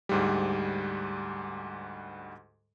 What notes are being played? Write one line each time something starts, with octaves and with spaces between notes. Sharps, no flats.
D2 G#2 G3